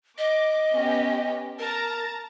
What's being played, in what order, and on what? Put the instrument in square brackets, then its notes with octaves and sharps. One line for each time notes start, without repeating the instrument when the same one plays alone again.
[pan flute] D#5 [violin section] D6
[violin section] B3 C#4 G4
[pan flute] A#4 [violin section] A5 A#5 A6